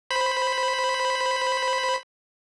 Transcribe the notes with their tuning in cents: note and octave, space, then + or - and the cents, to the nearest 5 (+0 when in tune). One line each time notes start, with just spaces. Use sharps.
C5 +0 B5 +0